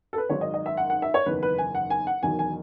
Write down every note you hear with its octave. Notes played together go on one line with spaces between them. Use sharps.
A4
B4
G#1 G#2 D#3 F#3 C#5
D#5
D#5
E5
F#5
F#5
E5
C#5
F#1 E2 D#3 B4
B4
G#5
F#5
G#5
F#5
E1 E2 D#3 F#3 G#5
G#5